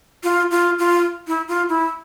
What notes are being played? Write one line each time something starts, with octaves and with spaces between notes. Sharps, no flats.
F4
F4
F4
E4
F4
E4